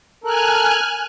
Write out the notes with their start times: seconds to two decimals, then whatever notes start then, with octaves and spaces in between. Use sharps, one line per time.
0.24 A4 A#4 G#5 F6 F#6